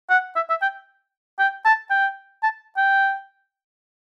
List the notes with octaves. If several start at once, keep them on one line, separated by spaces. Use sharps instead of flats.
F#5
E5
E5
G5
G5
A5
G5
A5
G5